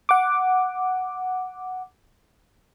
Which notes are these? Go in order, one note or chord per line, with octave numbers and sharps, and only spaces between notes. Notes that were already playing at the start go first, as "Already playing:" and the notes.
F#5 D6